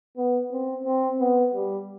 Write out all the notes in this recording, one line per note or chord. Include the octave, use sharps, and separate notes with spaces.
B3
C4
C4
B3
G3